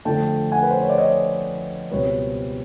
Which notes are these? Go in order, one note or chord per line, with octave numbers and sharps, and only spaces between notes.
F2 D3 F3 A3 G5 A5
F#5 G#5
B4
C5
C#5
D5
C#5 D#5
C#2 B2 G3 C4 B4 C#5